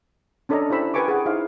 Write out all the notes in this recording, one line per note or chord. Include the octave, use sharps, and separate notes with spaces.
C#4 D4 A4 D5 D#5 A#5
E4 G4 C5 B5 E6
G4 A#4 B4 G#5 C#6 D6
G#4 F#5
D#4 E4 C5 F5